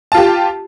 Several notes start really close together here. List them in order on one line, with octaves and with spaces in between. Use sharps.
A5 F4 G4